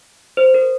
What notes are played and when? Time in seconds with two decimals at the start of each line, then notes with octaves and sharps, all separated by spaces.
0.37 C5
0.54 A#4